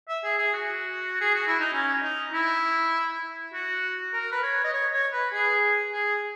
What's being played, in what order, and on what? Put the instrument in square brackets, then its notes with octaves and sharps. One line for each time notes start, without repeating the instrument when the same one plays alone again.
[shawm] E5
G#4
G#4
F#4
G#4
F#4
E4
D#4
C#4
D#4
E4
F#4
A#4
B4
C#5
D#5
C#5
C#5
B4
G#4
G#4